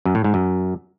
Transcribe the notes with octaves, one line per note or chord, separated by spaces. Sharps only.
F#2
A2
G#2
F#2